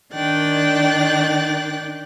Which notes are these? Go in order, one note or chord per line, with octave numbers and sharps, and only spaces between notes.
D#3 D4 G5 F#6 A6